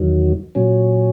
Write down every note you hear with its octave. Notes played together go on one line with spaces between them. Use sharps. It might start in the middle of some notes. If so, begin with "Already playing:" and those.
Already playing: E2 D#3 F#3
A#2 F#3 C#4